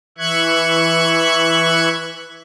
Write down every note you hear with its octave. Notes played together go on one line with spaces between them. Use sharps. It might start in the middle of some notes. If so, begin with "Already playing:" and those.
E3 E5 C#6 F#6 G#6